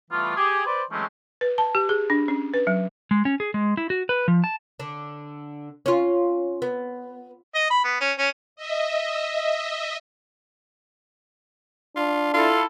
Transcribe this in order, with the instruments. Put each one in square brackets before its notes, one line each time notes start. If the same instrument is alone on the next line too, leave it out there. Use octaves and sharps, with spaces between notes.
[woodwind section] E3 G3 A3 B3 F4
G4 G#4
B4 C5 D5
E3 F#3 G#3 A3 C4 C#4
[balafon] B4
A5
G4
G#4
D4
C#4
B4
F#3
[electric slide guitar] G#3
C#4
G#4
G#3
E4
F#4
B4
F3
A5
[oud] D3 D4
C#4 F4
B3
[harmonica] D#5
B5
B3
C#4
C#4
[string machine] D#5 E5
[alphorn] D4 [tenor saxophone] F4
[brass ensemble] E4 A4 [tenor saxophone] F4